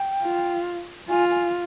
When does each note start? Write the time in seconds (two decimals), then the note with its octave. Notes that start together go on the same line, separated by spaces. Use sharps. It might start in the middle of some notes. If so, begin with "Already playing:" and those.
Already playing: G5
0.22 F4
1.09 F4 G#5
1.31 G#5